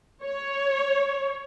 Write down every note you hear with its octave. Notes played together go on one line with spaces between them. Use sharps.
C#5